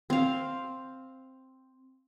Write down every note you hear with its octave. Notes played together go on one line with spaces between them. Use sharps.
C4 F5